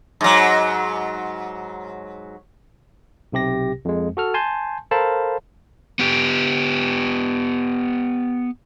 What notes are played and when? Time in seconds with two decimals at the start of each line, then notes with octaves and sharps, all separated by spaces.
0.21 G#2 F#3
3.32 B1 C3 G4 A#6
3.85 F2 G#3
4.17 F#4 A4 F6
4.34 G#5 A5 C6 G6
4.91 A4 A#4 C5 F5 A5 B5
5.99 B3 G4